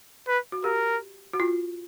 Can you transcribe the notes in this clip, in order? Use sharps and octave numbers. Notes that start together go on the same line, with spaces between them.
B4
F#4
G4 A#4
F#4
F4